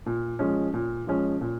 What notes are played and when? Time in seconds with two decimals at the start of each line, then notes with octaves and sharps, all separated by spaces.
0.06 A#2
0.39 F3 G#3 C#4
0.74 A#2
1.07 F3 G#3 C#4
1.41 A#2